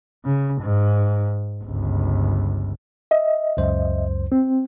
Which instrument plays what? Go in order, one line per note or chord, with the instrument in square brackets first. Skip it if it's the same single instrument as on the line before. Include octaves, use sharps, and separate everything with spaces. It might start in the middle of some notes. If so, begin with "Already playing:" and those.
[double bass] C#3
G#2
G1 C#2
[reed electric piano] D#5 E5
[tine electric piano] C#2 F#2 C5
[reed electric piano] C4